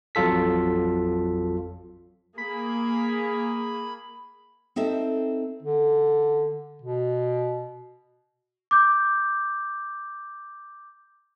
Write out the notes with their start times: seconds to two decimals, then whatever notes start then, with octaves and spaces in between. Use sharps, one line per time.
0.15 A1 F2 F#3 F4 A4 B6
2.38 A#3 G#4 B5
4.76 C4 D#4 A4 E5
5.63 D3
6.82 B2
8.71 D6 G6